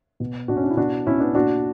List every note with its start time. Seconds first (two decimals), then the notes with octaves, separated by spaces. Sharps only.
0.20 B2
0.48 B2 D4 F#4
0.57 C#4
0.64 D4
0.70 E4
0.77 B2 D4 F#4
1.07 B2 C#4 E4
1.20 B3 D4
1.35 A#2 D4 F#4